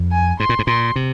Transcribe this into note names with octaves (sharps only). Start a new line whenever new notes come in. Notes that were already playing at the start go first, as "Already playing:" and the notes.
Already playing: F2
G#5
G#2 C6
A#2
G#2
A#2 C6
C3